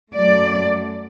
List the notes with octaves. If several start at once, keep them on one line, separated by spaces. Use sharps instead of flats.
F#2 F#3 A3 D5